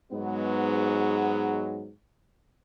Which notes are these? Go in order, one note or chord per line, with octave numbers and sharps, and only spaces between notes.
G#2 F#3 G#3 B3